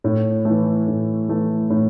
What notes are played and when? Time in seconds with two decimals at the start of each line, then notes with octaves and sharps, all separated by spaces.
0.04 A2
0.45 E3 A3
0.87 A2
1.29 E3 A3
1.70 A2